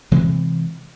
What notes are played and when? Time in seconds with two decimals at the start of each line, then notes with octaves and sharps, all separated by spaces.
0.11 C3 E3 G#3 C4